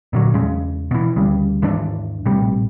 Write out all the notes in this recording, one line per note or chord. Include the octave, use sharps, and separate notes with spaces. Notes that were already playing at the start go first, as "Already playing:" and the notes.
A#2 D3 F#3
E2 C#3 G#3
B2 E3
D2 C#3 G3
D#2 G#2 E3 D4
A#1 A2 C3 G3